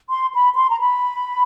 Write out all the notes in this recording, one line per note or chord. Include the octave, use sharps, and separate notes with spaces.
C6
B5
C6
A#5
B5